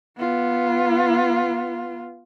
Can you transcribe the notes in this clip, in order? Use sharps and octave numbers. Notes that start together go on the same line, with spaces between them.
B3 F4